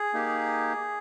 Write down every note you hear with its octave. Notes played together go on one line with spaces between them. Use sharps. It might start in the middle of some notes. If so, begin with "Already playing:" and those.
Already playing: G#4
A#3 D#4 G4